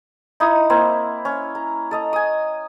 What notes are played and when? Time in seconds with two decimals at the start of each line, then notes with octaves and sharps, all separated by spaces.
0.40 D#4 E4 D#6
0.70 A#3 C4 E4
1.25 C#4
1.55 A#5
1.91 A4 D#5 A#5
2.13 G#5 D#6